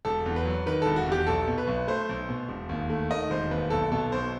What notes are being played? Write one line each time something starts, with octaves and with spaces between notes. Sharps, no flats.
E1 A4
E2
B4
F#3
D#3 B4
E1 A4
F#4
E2
G4
B1 A4
B2
B4
B1
A3 C5
B1
B2
E1
D#2
A3
D#3 D#5
E1 C5
D#2 B4
B1 A4
B2 A4
B1 C5